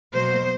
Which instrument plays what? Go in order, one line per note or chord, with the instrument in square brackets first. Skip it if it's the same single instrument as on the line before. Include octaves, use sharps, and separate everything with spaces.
[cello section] B2 F#3 A#3 C5